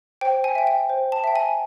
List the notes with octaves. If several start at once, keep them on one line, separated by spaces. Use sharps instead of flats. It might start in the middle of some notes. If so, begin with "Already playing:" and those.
C5 G5
G#5
E5 G5
G5
C5
A5
E5 G5
G#5